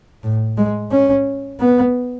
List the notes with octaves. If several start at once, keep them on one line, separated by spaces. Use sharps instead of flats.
A2
G#3
C#4
B3